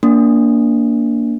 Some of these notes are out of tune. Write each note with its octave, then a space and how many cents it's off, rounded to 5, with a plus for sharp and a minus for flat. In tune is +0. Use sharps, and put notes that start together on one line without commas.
A#3 +0 D4 -20